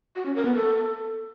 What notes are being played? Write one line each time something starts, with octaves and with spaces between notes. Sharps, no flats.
F#4
C#4
A#4
B3
A4